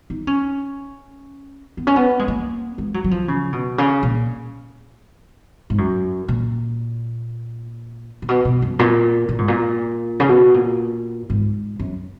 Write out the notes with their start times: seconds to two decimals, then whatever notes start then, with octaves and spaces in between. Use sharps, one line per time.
0.10 D#4
0.27 C#4
1.77 B3
1.87 C#4
1.96 B3
2.19 G#3
2.28 A#3
2.78 G#3
2.94 F#3
3.04 F#3
3.11 F3
3.28 C#3
3.53 B2
3.78 C#3
4.03 A#2
5.70 G#2
5.78 F#2
6.28 A#2
8.22 A#2
8.29 B2
8.45 B2
8.62 F#2
8.79 A#2
9.29 A#2
9.38 G#2
9.48 A#2
10.20 C#3
10.29 B2
10.54 A#2
11.30 G#2
11.79 F#2